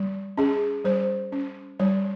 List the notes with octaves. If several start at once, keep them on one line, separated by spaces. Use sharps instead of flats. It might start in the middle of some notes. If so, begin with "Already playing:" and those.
Already playing: G3
C#4 G#4
G3 C5
C#4
G3 C#5